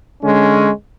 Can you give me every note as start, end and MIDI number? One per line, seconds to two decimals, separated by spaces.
0.23 0.69 50
0.23 0.69 56
0.23 0.69 61